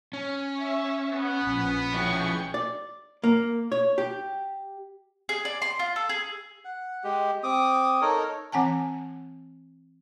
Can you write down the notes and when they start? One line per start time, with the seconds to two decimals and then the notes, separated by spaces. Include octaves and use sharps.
0.13 C#4
0.58 E5 C#6
1.11 B3
1.41 A#1
1.94 F3 C#4 E4 G#4 G5 C#6
2.54 D5
3.24 A#3
3.72 C#5
3.98 G4
5.29 G#4
5.45 D5
5.62 C6
5.79 F4
5.96 A4
6.09 G#4
6.65 F#5
7.04 G#3 G4
7.43 C4 D6 D#6
8.01 D#4 A4 A#4 C#5
8.52 E3 C4 F#5 G#5 A5